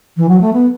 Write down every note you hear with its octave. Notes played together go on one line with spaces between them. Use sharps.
E3
F#3
A3
B3